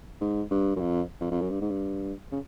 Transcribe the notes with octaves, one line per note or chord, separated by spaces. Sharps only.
G#2
G2
F#2
F2
F2
F2
F#2
G2
G#2
G2
C#3